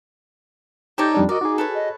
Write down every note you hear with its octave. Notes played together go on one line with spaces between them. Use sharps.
D#4 G4 A4 C#5 D5 A#5 G6
F2 G3 D4
F#4 A#4 D5 D#5
D#4 F#4 G#4
A4 B4 C#5
D#5